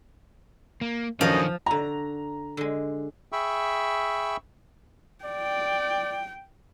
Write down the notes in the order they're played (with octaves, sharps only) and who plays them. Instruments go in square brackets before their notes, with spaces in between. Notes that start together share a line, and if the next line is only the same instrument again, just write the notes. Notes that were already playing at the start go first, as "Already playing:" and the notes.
[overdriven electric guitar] A#3
[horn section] F#2 D3 D#5 [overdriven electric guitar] D#3 C#4 [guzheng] F3
[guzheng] D3 F#4 [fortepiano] A#5
[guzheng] D3 G#3
[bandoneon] G#4 E5 G5 B5 C#6 E6
[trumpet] D5 [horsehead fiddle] G5